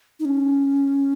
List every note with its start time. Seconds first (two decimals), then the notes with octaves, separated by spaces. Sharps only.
0.20 D#4
0.25 C#4